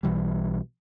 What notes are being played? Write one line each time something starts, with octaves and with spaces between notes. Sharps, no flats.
B1 B2 E3 G3